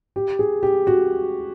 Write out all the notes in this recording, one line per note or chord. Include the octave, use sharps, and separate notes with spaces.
G4
G#4
G4
F#4